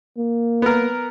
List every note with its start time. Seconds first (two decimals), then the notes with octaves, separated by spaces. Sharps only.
0.17 A#3
0.62 B3 A#4